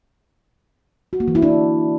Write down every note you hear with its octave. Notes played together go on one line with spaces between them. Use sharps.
F#4
A#3
E3
E4
D4